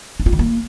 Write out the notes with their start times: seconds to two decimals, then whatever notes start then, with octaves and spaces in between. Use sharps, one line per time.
0.20 D4
0.26 F4
0.33 D#3
0.39 A#3